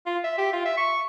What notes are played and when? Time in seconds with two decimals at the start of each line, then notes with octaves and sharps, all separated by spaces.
0.06 F4
0.24 E5
0.38 G4
0.53 F4
0.65 E5
0.77 C#6